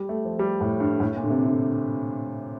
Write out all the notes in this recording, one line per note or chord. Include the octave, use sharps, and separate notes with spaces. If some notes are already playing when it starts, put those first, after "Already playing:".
Already playing: G3
A3
F3
G3
A2
G2
A2
A#2
D3
C3
D3